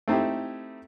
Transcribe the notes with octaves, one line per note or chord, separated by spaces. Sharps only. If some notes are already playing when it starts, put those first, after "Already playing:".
A3 C4 D#4 E4 G4